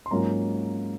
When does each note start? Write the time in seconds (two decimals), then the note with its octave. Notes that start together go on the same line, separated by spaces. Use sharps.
0.06 C6
0.11 G#2 F#3 A#3 C#4 F4 A#5